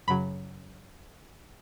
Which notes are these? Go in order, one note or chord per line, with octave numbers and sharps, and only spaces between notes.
F#2 C#3 F#3 B5